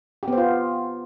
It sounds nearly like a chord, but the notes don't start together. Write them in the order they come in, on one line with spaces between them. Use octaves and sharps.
G4 B3 C5 F4